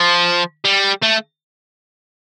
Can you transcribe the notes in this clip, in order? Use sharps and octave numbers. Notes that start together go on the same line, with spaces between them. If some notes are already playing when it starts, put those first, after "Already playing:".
Already playing: F3
G3
A3